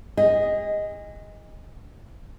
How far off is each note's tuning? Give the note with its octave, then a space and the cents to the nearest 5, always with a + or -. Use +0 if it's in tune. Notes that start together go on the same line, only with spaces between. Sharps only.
G#4 -40 D#5 +0